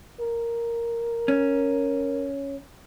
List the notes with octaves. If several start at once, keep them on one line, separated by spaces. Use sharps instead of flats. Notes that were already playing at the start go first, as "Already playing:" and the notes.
A#4
C#4